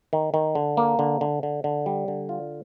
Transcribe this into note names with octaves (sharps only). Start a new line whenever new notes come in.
D#3
D#3
D3
A#3
D3
D3
D3
D3
G3
D3
F4